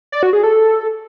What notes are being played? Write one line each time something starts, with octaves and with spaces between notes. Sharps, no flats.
D5
F#4
G#4
A4